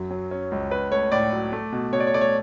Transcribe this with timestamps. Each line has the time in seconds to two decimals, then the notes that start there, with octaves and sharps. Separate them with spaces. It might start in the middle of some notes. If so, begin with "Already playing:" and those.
Already playing: F#2 F#3
0.11 F#3
0.31 C#4
0.51 C#2
0.71 C#4 B4
0.91 A3 C#5
1.12 A2 D5
1.33 F#3
1.52 A3
1.72 B2
1.93 B2 C#5
2.00 D5
2.07 C#5
2.14 A3 D5
2.21 C#5